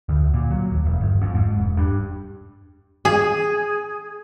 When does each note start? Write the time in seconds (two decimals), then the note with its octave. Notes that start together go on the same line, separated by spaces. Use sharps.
0.09 D2
0.34 A#2
0.50 F#3
0.71 D#2
0.85 E1
1.01 G1
1.21 F2
1.35 G#2
1.56 E1
1.77 G2
3.05 G#4